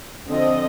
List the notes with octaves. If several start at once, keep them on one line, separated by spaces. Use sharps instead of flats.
D3 F3 C4 D#5